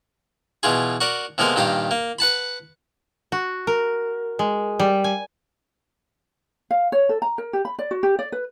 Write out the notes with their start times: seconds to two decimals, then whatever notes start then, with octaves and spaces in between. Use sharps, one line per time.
0.63 B2 E3 F4 G#4
1.01 F#4 A#4 D5
1.38 C3 F3 G#3 A#3 B3 A#4
1.56 G2 A#2 D#3 G4 F5 A#5
1.91 A#3
2.19 B4 F#5 A5 B5
3.32 F#4
3.67 A#4
4.39 G#3
4.79 G3
5.04 G#5
6.71 F5
6.92 C#5
7.09 A4
7.22 A#5
7.38 A#4
7.53 G4
7.65 B5
7.79 D5
7.91 F#4
8.03 G4
8.19 D5
8.32 B4